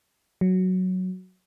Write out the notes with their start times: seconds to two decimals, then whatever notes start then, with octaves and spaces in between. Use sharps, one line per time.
0.41 F#3